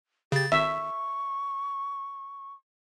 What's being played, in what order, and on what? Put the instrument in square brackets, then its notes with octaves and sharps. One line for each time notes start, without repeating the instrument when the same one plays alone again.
[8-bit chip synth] C#3 A6 [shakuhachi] G4
[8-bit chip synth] G#1 [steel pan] E5 [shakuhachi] C#6